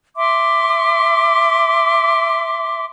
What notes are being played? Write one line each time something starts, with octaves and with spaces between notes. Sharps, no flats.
E5 C6 D6